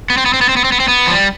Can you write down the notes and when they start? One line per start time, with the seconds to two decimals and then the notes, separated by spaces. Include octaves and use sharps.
0.10 B3
0.17 C4
0.26 B3
0.34 C4
0.41 B3
0.49 C4
0.57 B3
0.64 C4
0.72 B3
0.80 C4
0.88 B3
1.07 F3
1.11 G3